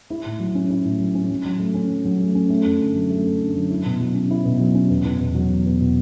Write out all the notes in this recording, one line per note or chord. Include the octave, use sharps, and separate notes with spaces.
E4
A2
F#3
C#4
E4
A2
F#3
C#4
F#3
F#3
A3
C#4
F#3
F#3
A3
C#4
A3
F#2
D3
F#3
A3
F#2
D3
F#3
E4
B2
F#3
C#4
E4
B2
F#3
C#4
E2
E2
B2
F#3
E2
E2
B2